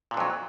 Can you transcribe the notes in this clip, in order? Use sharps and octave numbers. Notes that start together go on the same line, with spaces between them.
F2 A#2 D3 F#3